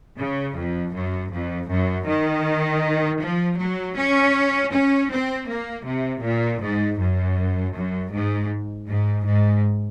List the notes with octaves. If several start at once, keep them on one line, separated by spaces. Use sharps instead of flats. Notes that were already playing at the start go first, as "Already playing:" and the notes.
C#3
F2
F#2
F2
F#2
D#3
F3
F#3
C#4
C#4
C4
A#3
C3
A#2
G#2
F#2
F#2
G#2
G#2
G#2